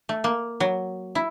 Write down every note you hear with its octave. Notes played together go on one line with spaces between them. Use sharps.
A3
A#3
F#3
E4